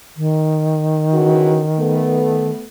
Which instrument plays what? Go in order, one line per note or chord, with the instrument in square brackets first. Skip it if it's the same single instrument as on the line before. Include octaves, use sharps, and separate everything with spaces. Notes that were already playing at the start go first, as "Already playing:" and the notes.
[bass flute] D#3
[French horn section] C#3 E3 F#4
A3 B3